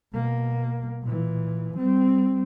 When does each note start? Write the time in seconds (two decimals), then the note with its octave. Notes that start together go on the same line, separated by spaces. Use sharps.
0.13 B2 A#3
1.03 A#2 E3
1.77 G3 C4